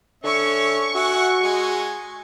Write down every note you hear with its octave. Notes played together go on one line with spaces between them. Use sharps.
D3 C#4 E5 C#6
F#4 E5 F#5 G#5
G#3 G#5